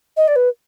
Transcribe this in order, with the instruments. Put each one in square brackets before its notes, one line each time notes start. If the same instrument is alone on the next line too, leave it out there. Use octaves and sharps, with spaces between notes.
[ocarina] D#5
D5
B4